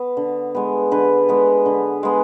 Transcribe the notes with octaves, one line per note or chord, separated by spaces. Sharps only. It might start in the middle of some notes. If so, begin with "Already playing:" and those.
Already playing: B3
D3
G#3 B3
D3 B4
G#3 B3
D3
G#3 B3